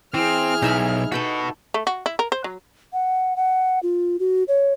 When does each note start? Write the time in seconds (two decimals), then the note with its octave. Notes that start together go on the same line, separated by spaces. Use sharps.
0.14 E3 C4 G#4 F6
0.62 B1 D#4 E5 B5
1.12 F#4 A4 B4 G5 B5
1.74 A3
1.87 F#4
2.06 E4
2.19 A#4
2.32 C5
2.44 F#3
2.93 F#5
3.36 F#5
3.83 F4
4.20 F#4
4.48 C#5